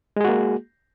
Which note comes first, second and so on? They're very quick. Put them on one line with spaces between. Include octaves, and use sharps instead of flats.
G#3 G#4 F#4 A#3